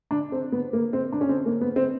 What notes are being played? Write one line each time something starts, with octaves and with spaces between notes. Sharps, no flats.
D4
C4
B3
A#3
C4
D4
C#4
C4
A#3
B3
C4